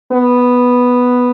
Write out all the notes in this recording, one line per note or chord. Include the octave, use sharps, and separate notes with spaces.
B3